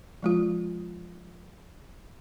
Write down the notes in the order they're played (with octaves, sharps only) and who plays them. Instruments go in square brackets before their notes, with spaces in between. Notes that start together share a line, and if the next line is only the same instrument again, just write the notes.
[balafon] F3 G#3 F4